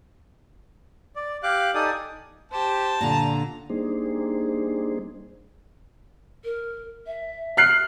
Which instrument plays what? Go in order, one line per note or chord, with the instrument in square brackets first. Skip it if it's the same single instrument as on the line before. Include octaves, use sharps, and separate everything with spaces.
[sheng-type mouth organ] D5
G4 F5 D6 F#6
D#4 G4 A4 D5 G#5 D#6
[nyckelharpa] G4 C5 [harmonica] A5
[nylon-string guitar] A#2 D3 [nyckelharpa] A#5
[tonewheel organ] G3 A#3 D4 D#4 G#4 C5
[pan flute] A#4
E5
[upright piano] F6 F#6 C7